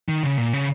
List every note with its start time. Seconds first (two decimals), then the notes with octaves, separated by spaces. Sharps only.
0.08 D#3
0.23 C#3
0.38 A#2
0.53 C#3